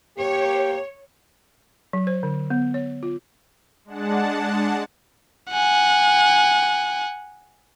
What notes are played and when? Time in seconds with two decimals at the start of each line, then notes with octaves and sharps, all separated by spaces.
0.18 A#3 G4 C#5
1.93 F#3
2.07 C5
2.23 D3
2.50 B3
2.74 C#5
3.03 F4
3.85 G#3 D4 F#5 A5
5.51 F#5 G#5